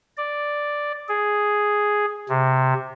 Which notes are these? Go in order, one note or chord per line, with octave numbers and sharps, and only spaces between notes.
D5
G#4
C3